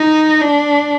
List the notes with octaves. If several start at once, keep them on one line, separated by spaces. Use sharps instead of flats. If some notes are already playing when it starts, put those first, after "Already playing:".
Already playing: D#4
D4